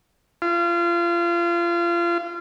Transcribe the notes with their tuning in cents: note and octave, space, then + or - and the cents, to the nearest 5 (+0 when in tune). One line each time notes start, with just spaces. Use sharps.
F4 -30